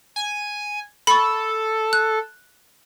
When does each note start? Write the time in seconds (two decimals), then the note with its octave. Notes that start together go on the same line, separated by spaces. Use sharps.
0.16 G#5
1.07 A4 B5 C#6
1.93 F#6